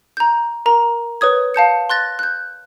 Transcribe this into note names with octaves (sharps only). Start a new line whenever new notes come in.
A#5 G6
A#4 A#5
B4 C#5 D#6 G#6
F5 A5 G6 C#7
C6 F#6 A6 A#6
F#6 G6